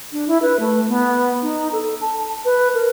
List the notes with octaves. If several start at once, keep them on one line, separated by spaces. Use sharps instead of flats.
D4
E4
B4
A3
B3
D#4
A4
A5
B4
A#4